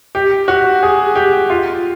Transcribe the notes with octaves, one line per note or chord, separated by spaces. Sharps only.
G4
F#4
G#4
G4
F4